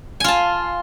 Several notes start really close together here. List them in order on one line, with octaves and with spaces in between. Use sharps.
G#5 F4 A5